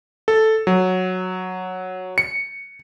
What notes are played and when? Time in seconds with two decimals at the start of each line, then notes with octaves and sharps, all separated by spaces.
0.28 A4
0.67 F#3
2.18 C#7